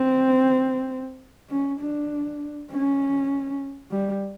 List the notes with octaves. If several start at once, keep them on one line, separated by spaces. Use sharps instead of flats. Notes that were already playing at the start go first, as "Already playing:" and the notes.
Already playing: C4
C#4
D4
C#4
G3